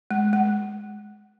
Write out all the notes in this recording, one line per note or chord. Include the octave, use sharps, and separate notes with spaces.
G#3
G#3